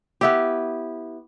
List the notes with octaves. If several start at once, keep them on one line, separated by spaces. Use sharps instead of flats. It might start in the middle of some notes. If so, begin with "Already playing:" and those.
B3 E4 G4